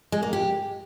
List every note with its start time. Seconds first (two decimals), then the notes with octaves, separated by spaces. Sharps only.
0.12 G#3
0.23 A#3
0.33 G4